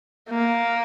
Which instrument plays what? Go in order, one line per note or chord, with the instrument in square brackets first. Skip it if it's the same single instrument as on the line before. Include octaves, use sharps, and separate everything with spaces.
[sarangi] A#3